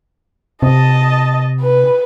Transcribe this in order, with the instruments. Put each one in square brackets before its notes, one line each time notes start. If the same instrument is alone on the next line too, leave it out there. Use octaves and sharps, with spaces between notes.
[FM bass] C3 [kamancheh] D#5 A5
[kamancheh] B4